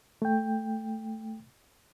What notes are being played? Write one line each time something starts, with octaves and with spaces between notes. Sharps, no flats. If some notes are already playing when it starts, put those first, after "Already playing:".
A3 G5